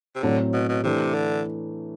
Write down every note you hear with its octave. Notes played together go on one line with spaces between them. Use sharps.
C3
A2 D3 F#3 C4
B2
B2
C3 E3 A3 D4
D3